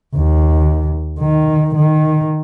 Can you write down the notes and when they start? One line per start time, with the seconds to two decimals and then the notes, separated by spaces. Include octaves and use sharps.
0.15 D#2
1.20 D#3
1.76 D#3